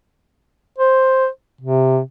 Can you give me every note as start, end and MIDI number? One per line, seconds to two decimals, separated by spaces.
0.79 1.28 72
1.61 2.00 48